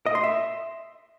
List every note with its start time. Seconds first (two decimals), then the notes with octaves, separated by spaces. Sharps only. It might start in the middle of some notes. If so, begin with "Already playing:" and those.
0.06 D#5
0.15 C6
0.24 E5